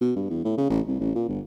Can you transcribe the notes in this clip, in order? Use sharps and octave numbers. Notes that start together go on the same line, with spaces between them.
B2
G2
E2
A2
C#3
A1
C2
A1
A#2
G1